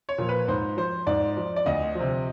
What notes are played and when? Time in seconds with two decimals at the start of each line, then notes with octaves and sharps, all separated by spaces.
0.09 C#5
0.18 A#2 F3
0.29 B4
0.48 G#2 C5
0.77 F3 C5
1.07 G#2 D5
1.37 F3
1.56 D5
1.66 D2 D#5
1.95 F3
2.00 C3